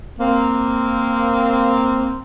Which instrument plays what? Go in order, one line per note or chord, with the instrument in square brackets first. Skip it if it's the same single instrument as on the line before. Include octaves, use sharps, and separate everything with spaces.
[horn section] A#3 C4